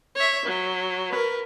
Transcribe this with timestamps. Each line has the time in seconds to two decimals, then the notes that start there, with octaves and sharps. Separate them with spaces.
0.16 C#5 E5
0.46 F#3
1.10 A#4 B4